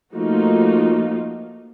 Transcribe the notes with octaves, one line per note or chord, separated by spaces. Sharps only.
F3 A3 A#3 D#4 F4 F#4